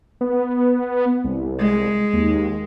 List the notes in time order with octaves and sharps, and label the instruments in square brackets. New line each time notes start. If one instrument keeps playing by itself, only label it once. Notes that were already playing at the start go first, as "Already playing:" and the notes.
[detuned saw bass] B3
C2
[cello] G#3
[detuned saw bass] D#2